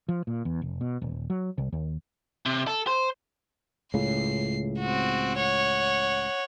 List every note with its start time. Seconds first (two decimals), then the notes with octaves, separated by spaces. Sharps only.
0.09 F3
0.27 A#2
0.45 E2
0.62 F1
0.81 B2
1.02 D#1
1.30 F#3
1.58 C2
1.72 D#2
2.46 C3
2.67 A4
2.87 C5
3.94 C#2 A2 C#3 C7
4.80 C4 F#4
5.37 C#5 F#5